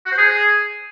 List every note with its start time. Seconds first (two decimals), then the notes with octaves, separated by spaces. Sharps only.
0.06 F#4
0.12 C5
0.18 G#4